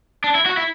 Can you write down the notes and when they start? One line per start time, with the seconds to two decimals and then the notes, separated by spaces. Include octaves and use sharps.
0.24 D4
0.35 E4
0.46 F#4
0.57 E4